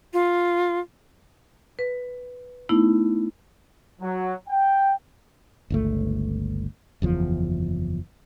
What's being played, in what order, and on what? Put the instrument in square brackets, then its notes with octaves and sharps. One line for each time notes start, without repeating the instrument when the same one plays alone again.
[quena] F4
[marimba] B4
A3 B3 D#4 E4
[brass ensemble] F#3
G5
[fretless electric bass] G1 C#2 A3
F#1 E2 F3